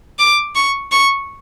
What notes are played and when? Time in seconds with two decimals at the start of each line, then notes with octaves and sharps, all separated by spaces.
0.19 D6
0.55 C#6
0.92 C#6